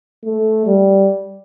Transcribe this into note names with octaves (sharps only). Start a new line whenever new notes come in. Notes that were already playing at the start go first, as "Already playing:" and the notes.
A3
G3